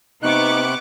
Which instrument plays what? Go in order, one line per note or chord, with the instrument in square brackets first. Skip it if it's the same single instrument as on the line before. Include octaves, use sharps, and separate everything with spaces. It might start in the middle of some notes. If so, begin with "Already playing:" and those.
[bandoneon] C3 F#6 [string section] B3 C#6 D6 [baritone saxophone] D#4